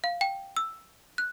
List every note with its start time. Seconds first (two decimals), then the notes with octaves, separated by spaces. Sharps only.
0.04 F5
0.21 G5
0.57 E6
1.18 F#6